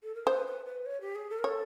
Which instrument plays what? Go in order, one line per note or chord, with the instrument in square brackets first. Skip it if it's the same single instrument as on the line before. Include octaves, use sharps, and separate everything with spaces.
[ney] A4
A#4
[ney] B4 [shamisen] C5
[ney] B4
B4
C#5
G4
G#4
A4
A#4
[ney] A4 [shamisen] C#5